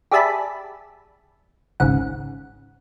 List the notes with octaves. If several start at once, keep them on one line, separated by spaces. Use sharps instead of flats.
G4 G#4 D5 E5 A5 B5
G#1 C#2 C#3 F#5